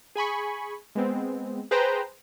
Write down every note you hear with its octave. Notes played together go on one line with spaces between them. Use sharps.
G#4 G#5 B5 C#6
G#3 B3 C4
G#4 B4 C5 G5 A#5